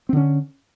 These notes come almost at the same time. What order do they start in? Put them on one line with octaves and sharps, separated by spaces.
C4 D3 C#4